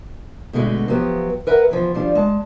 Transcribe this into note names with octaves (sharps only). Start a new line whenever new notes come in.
B2 D3 G#3 A3 F#4
F3 F#3 B3 G4
A#4 B4 E5 F#5 G5 A#5
E2 E3 F3
F3 G3 D4 F4
G#3 A5